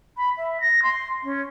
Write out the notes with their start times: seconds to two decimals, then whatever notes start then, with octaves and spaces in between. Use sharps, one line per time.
0.16 B5
0.37 E5
0.60 A#6
0.82 C6
1.23 C#4